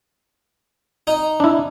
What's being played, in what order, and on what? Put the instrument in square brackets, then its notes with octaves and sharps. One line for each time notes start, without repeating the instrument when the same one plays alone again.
[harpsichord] D#4
[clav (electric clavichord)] D4 E4